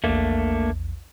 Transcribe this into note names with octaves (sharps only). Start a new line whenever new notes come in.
A#1 E2 A3 A#3 D4